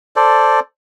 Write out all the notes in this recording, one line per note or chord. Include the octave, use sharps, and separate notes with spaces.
A4 C5 D5